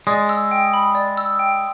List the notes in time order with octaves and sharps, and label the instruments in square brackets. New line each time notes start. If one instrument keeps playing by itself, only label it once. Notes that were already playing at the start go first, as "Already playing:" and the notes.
[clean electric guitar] G#3 [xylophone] D5
[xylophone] E6
G5
B5
D5
E6
G5